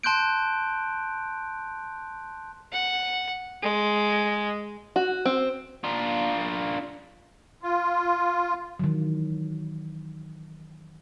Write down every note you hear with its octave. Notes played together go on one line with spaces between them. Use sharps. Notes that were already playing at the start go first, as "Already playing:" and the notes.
A5 C6 F#6 G6 D7
F#5
G#3
F#4
C4
D4 F4
F4
D#3 E3 F#3